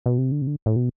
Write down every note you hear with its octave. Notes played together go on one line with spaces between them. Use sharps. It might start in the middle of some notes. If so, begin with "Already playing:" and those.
B2
C3
D3
C3
D3
A2
B2